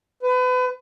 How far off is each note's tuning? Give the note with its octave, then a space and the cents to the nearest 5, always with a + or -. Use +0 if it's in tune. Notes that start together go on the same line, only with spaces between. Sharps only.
B4 +35